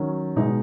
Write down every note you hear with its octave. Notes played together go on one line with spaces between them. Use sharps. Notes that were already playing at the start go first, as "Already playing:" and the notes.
Already playing: D#3 F#3 C#4
B2 G#3 B3 D#4